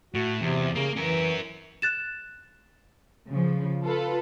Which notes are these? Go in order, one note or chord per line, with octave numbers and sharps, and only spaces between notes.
A2 F#4
E2 C3
C#3 A#3
E3 C#4 A#4
F#6 A6 E7
C#3 F3
F4 A4 B4